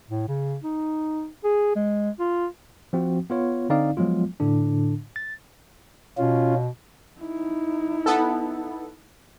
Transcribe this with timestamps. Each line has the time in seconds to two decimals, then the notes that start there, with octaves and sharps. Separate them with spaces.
0.10 A2
0.28 C#3
0.64 D#4
1.44 G#4
1.76 G#3
2.19 F4
2.93 F3 C4 F#4
3.30 B3 F4 C#5
3.70 D3 C4 D#4 D5 F5
3.97 F3 F#3 G#3 B3 F4
4.40 A2 D3 D4
5.16 A6
6.18 B2 C#4 F4
7.21 D#4 E4
8.06 B3 A4